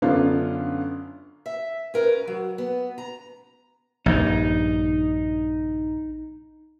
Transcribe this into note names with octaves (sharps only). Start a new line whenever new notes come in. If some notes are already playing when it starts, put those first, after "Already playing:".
F#2 D3 B3 C#4 D4 F4
E5
C#4 A#4 B4
F#3
B3
A#5
A#1 G2 D#4